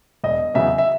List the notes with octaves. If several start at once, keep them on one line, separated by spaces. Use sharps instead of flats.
E1 D#5
E2 C#3 F#3 B3 E5
E5